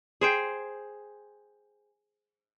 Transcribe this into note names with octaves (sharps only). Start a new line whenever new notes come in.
G#4 C5 G5